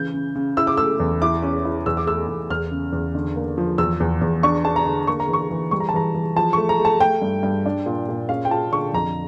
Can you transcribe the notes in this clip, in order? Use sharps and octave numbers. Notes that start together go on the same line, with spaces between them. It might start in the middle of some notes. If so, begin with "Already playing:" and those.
Already playing: C#3 E3 G6
C#3
C#3
E4 E6
D6
A3 E6
E2
E4 D6
C#4
E4
E2 E6
D6
A3 E6
E2
E2 F6
C#3
E2
D3
A#3
F3
E2 E6
E2
E2
D4 C#6
D4 A5
A#5
D3
A#3 C#6
A#5
E3 C#6
E3
G3 C#6
A#5
A5
E3 A#5
E3
F3 A5
A3 C#6
A#5
A3 A5
A3 G5
G2
G2
D4
A#2
A#2
C#4 F5
G5
F4 A5
D3 C#6
F2 A#5